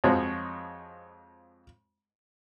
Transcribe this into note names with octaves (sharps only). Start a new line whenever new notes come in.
F2 F3 G#3 F#4 C#5